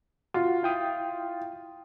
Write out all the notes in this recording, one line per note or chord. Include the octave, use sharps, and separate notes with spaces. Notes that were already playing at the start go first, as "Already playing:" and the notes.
F4 F#4
E4 G5 D#6